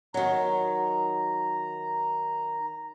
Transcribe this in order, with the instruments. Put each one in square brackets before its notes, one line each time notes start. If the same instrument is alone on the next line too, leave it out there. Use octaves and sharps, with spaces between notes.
[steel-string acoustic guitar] D#3 F#3 [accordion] A#5